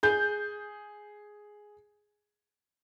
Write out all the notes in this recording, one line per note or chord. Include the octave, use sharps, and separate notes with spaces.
G#4 G6